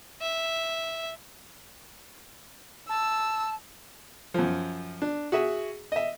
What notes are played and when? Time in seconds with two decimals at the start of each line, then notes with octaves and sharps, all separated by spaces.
0.21 E5
2.89 A5 E6
4.34 F#2 F3
5.02 D4
5.32 F#4 G#4 E5
5.92 D#5 E5